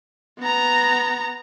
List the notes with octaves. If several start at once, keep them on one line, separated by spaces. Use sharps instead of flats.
B3 A#5